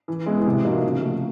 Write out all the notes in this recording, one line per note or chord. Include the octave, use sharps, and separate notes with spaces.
E3
G#3 B3 E4
C3
F3 A#3 D#4 F#4
C#3
F3 A3